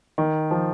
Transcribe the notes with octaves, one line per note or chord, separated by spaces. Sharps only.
D#3
F3